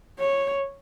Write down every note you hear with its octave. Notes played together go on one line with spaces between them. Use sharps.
C#5